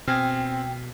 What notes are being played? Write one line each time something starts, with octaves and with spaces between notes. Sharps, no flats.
B2 C4 F5 G5 G#5 D#6